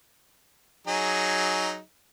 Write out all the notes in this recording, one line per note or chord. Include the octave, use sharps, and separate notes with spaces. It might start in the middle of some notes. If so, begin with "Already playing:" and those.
F#3 D#4 G#4